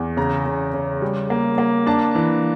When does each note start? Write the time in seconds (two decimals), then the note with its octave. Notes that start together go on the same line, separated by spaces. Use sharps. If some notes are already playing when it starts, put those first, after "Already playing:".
Already playing: E2
0.17 C#3 A#5
0.46 C#3
0.74 C#3
1.02 G3
1.30 A#3
1.58 A#3
1.86 D4 A5
2.15 E3